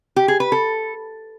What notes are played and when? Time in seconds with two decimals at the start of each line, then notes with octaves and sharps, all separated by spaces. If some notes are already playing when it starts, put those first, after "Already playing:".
0.16 G4
0.28 G#4
0.40 B4
0.52 A4